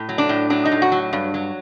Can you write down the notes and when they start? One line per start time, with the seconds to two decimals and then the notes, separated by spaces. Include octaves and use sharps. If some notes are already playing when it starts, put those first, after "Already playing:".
Already playing: A2
0.09 F#3
0.18 D4
0.29 A2
0.50 F#3 D4
0.65 D#4
0.72 A2
0.82 F#4
0.92 F#3
1.13 G2
1.34 F#3